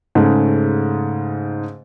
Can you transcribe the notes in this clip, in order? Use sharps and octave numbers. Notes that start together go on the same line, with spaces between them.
G#2 C#3 G#3 A3